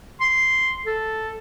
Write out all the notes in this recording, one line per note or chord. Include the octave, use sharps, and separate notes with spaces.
C6
A4